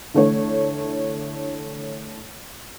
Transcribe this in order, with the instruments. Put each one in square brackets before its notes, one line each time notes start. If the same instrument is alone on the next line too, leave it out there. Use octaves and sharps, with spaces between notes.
[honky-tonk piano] D3 E3 A3 D4 A4 C#5